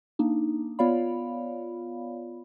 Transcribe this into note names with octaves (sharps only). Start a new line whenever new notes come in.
A#3 D4 D#4
B3 F4 C#5 D5 F5 B5